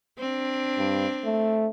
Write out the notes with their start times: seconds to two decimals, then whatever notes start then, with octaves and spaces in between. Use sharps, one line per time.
0.19 C4 D4
0.78 G2
1.25 A3